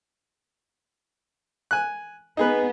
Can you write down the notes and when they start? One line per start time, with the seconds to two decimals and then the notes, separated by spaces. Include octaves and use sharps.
1.71 G#5 F#6
2.37 B3 D#4 G#4 B4